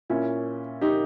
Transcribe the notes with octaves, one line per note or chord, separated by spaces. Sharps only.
A#2 C#4 E4
D#4 G4